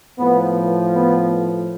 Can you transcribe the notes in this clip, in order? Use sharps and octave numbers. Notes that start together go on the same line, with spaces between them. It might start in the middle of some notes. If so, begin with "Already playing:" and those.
A2 F3 B3
B3